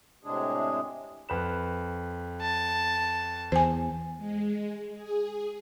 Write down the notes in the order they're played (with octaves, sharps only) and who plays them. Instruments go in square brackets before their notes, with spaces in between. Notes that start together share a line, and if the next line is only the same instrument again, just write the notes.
[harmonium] A2 C3 G#3 D4 G#4
[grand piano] F2 B4 E7
[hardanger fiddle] A5
[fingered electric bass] E2 [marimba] C5 G#5
[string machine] G#3
G#4